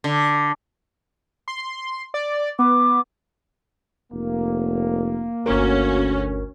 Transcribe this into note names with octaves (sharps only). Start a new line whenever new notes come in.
D3
C6
D5
B3 D6
F1 A#3
G1 D2 C#4 F#4 A#4